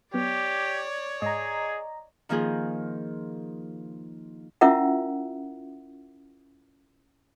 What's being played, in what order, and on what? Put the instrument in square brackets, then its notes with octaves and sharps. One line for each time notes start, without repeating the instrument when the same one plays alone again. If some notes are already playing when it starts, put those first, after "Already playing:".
[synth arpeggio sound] F#3 B3 [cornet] G4 [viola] C#5 D5
[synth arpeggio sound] G#2 [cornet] G#4 [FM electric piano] D#5 A#5
[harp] D#3 F3 A#3 F4 G#4
[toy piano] C#4 E4 F4 A#4 E5 F#5